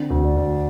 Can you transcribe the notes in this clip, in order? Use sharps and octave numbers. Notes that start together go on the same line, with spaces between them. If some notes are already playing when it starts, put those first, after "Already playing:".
Already playing: D3 C4
D2
D5
D2